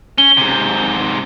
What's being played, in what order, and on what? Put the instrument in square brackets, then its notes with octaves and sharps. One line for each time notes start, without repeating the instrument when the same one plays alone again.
[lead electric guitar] C#4 [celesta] G7
[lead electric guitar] G#2 C3